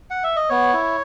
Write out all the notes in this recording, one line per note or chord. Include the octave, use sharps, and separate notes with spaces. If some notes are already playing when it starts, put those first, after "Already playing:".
F#5
E5
D#5
B3 C#5
E4